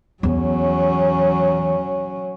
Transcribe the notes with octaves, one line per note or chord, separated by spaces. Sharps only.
E2 F#3 C#4